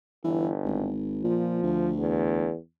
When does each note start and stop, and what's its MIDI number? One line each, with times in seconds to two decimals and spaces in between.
0.24 0.89 31
0.24 0.49 52
0.64 1.23 32
1.24 1.62 46
1.24 1.92 53
1.63 2.49 38
1.98 2.55 40